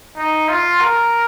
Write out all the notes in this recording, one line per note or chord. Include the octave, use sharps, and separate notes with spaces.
D#4
F4
A#4